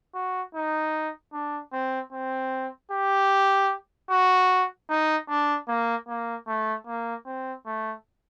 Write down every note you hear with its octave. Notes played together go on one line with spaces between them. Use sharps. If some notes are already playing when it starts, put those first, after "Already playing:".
F#4
D#4
D4
C4
C4
G4
F#4
D#4
D4
A#3
A#3
A3
A#3
C4
A3